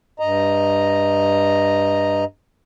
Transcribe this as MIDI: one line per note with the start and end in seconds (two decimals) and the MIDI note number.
0.20 2.24 43
0.20 2.24 75
0.20 2.24 82